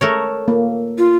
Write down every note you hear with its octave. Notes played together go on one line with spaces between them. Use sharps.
A3 A#4 C#5
A#3
F4